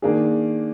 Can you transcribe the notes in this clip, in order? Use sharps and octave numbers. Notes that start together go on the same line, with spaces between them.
D#3 A#3 D4 G#4